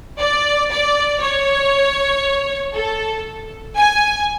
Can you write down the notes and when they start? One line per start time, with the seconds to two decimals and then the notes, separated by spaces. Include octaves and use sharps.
0.19 D5
0.70 D5
1.21 C#5
2.74 A4
3.76 G#5